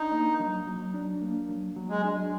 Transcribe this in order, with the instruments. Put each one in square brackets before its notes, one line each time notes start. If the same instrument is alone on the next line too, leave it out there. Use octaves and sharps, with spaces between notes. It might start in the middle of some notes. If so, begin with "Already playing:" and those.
Already playing: [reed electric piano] D4 [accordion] D#4
[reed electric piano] A#3
F#3
F#3
D4
A#3
F#3
F#3
[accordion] G#3
[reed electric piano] D4